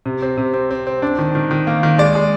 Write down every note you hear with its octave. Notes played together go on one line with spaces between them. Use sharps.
C3
C4
C3
C4
C4
C4
D4
D#3
D#3
D#3
A#3
D#3
G#3 D5
G#3